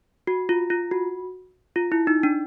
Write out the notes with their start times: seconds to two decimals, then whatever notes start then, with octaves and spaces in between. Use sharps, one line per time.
0.27 F#4
0.49 F4
0.70 F4
0.91 F#4
1.76 F4
1.92 E4
2.07 D#4
2.23 D4